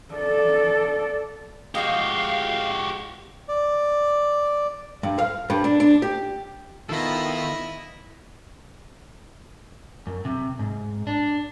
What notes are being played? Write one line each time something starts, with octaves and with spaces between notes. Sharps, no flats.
A4 D5
F3 G#3 F#4 G4 F5
D5
G2
F5
G2
D4
D4
G4
D#3 B3 E4 F4 A4 D#5
F#2
C3
G#2
D4